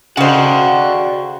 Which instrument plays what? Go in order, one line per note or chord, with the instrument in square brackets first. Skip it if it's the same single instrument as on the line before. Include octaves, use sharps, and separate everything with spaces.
[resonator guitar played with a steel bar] C#3 C5 [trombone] F#4 [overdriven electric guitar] D5 F#5 [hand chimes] D#5 G5